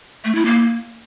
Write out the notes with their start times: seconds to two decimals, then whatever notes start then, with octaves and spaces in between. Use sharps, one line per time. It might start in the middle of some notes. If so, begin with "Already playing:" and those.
0.25 A3
0.35 E4
0.46 A#3